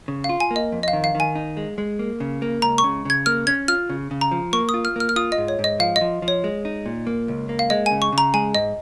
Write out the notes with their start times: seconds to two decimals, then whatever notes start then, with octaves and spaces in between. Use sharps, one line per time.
0.08 C#3
0.24 F5
0.29 F4
0.40 G#5
0.51 A#3
0.56 D#5
0.72 F2
0.83 D#5
0.88 F5
0.93 D#3
1.04 F5
1.15 D#3
1.20 G#5
1.35 D#4
1.57 G#3
1.78 G#3
1.99 A#3
2.20 C#3
2.42 A#3
2.62 C#2 A#5
2.78 C#6
2.84 C#3
3.05 C#3 G#6
3.26 A#3 F6
3.47 C#4 G#6
3.68 F4 F6
3.89 C#3
4.11 C#3
4.21 A#5
4.31 F3
4.53 A#3 C#6
4.69 D#6
4.74 F4
4.85 F6
4.96 A#3 F6
5.09 F6
5.16 F4 D#6
5.32 D#5
5.38 G#2
5.48 C#5
5.59 G#2
5.64 D#5
5.80 F3 F5
5.96 D#5
6.01 F3
6.22 F3
6.28 C#5
6.44 G#3
6.65 D#4
6.86 A#2
7.07 A#3
7.28 C#2
7.49 A#3
7.59 F5
7.70 G#3 D#5
7.86 G#5
7.91 C#3
8.02 C#6
8.12 C#3
8.18 A#5
8.34 G#3 G#5
8.55 G#2 D#5